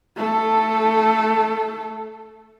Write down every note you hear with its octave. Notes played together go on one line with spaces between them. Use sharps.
A3 A4